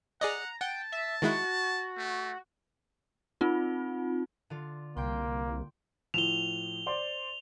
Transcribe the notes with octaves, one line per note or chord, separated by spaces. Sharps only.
G#4 D5 D#5 F#5 A#5
F#5 G5 A5
E5
D#3 G#3 E4 F#4
A3
C4 D#4 F4
D3 F4
C2 A#3 G5 C6
A2 F3 E7 F7 G7
C5 D5 C6